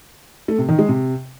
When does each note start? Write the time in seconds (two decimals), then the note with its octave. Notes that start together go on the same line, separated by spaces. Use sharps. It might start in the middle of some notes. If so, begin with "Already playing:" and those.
0.48 A3
0.58 C3
0.69 D#3
0.79 G#3
0.89 C3